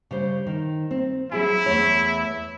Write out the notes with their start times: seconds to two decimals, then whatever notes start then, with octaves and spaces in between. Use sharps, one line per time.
0.11 C#3 G3 C5
0.47 D#3
0.91 C4
1.32 F#3 E4 G#4 G#5
1.66 E2 A3 C#5